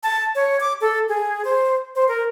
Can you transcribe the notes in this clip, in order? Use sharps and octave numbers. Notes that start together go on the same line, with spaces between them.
A5
C#5
D6
A4
G#4
C5
C5
A#4